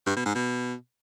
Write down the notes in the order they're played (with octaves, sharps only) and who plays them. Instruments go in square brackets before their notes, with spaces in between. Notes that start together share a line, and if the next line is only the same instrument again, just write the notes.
[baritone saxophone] G2
B2
G#2
B2